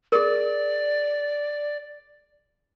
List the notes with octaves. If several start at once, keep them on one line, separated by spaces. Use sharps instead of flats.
G#4 A#4 D5